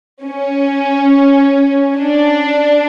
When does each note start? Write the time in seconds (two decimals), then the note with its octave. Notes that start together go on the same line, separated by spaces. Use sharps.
0.24 C#4
1.97 D4